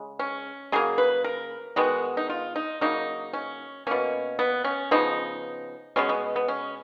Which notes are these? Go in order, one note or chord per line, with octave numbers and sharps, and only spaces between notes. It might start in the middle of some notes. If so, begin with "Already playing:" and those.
Already playing: C#3 G#3
C#4
C#3 F#3 A#3 G#4
B4
A#4
D#3 G#3 B3 F#4
D#4
F4
D#4
C#3 F#3 A#3 D#4
C#4
B2 A#3 C#4
B3
C#4
C#3 F3 B3 D#4
B2 G#3 B3 C#4
B3
B3
C#4